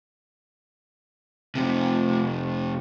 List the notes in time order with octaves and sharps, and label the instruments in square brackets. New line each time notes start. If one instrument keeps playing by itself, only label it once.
[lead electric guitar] F2 C3